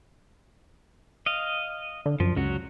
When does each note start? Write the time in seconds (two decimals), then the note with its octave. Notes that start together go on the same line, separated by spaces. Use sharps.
1.26 D#5 F5
2.06 D3
2.20 F#2 F3
2.36 C#2 F#3 F#4